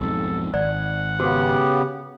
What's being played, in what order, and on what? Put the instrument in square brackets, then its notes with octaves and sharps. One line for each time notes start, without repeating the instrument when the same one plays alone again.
[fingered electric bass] B1 F2 G#2 [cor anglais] A4
[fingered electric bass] G#1 [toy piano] D5 [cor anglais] F#5
[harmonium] C#3 B3 G4 [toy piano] F#4